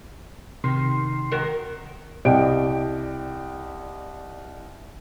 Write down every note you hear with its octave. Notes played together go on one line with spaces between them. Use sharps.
C3 D#3 C6 C7
D#3 F#4 A#4
C2 D5 D#5 G5 D7